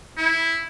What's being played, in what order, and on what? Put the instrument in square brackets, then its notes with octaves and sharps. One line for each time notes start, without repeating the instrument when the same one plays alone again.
[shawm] E4